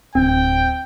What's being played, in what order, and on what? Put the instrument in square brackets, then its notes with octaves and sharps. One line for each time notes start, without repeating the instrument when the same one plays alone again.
[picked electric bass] D1 [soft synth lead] C4 [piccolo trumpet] G5